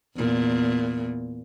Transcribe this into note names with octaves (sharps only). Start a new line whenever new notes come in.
E2 A#2